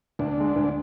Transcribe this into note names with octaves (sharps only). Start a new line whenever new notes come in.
D2 D4
D3 G#3
D2